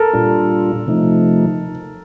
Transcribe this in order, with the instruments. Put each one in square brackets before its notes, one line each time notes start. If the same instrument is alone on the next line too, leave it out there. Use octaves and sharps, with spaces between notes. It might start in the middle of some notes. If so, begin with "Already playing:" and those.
Already playing: [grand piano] A4 A#4
[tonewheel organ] A#2 G3 D4 F4
C3 F3 A3 D#4